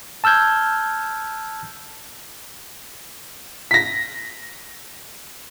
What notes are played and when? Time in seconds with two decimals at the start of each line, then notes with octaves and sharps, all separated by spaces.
0.24 A5 E6 F6 G6 G#6
3.71 A#6 B6